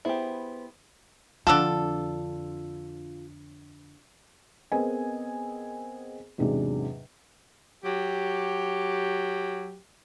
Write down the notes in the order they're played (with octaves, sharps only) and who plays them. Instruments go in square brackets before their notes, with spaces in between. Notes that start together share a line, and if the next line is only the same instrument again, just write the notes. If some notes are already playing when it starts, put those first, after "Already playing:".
[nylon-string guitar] B3 G#4 C5 [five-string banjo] E4 G4
[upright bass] F2 D3 [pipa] D4 A4 [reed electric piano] F4 [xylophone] F#5 E6
[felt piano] B3 C4 G#4 A#4 D#5 G#5
E2 G#2 C3 F#3 G#3 D4
[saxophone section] F#3 G4